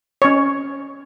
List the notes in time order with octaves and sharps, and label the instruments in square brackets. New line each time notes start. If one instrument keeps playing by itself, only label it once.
[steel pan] C#4 C#5